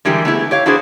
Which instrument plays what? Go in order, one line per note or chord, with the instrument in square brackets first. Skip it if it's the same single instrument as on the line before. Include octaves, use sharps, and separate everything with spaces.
[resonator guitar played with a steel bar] D3 E3 G3 G#3 G4 A#4
A3 B3 E4 G#4
G4 C#5 F5
D4 E4 F#4 G#4 C5